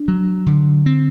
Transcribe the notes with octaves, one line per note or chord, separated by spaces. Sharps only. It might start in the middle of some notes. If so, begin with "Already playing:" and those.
Already playing: D4
F#3
D3
C4